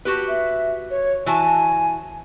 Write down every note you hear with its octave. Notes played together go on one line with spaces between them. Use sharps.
F#4 G4 B4
E5
C#5
E3 F#4 G#5 A5